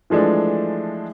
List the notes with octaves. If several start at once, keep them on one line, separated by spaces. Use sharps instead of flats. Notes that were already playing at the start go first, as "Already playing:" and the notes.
E3 F3 G#3 A3 D4